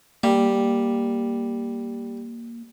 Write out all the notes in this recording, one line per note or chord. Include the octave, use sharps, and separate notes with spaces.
G3 A#3